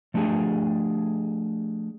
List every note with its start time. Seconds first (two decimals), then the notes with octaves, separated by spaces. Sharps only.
0.14 F3 A3 D4 G4 G#4